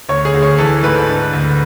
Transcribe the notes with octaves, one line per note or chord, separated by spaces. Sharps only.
D2 C#5
G#4
D2
C#5
E3 A4
G#2 B4
D3
D2